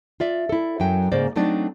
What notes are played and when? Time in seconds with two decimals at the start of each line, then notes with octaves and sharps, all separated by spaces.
0.20 F4 D5 E5
0.49 E4 A4
0.80 F#2 F#3 G5
1.12 G#2 C#3 A#3 C5 D5
1.36 F#3 A3 C4 D4 D#4 D5